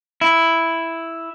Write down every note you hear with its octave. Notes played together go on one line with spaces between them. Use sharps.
E4